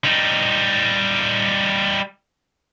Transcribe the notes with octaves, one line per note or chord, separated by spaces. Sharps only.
G3 D#4